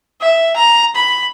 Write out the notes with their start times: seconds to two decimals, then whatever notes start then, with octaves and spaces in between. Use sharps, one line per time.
0.21 E5
0.56 A#5
0.95 B5